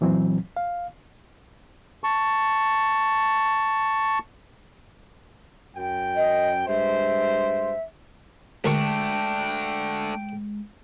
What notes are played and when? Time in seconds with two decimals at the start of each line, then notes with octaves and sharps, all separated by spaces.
0.01 A#2 E3 F#3 C4
0.57 F5
2.04 A5 C#6
5.76 F#2 G5
6.16 D#5
6.67 G2 G#3 C5 E5
8.65 D2 G#3 A3 D4 A#4 G5 C#6